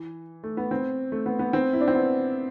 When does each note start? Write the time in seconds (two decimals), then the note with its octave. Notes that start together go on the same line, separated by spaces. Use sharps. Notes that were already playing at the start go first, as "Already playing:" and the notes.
Already playing: E3
0.44 A3
0.57 B3
0.71 C4
1.12 A3
1.26 B3
1.39 B3
1.53 C4
1.73 E4
1.81 D4
1.88 C4
1.94 B3